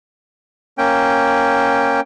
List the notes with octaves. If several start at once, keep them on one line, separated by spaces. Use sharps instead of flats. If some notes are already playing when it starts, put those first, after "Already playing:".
A#3 C#4 G5